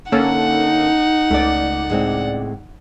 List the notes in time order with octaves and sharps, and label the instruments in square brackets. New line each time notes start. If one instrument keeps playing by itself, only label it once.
[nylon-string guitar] D3 [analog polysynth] A#3 C#4 A4 [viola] D#4 [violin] F#5
[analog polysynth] C#2 D5 [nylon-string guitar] A3
[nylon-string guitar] A2 G#3 C4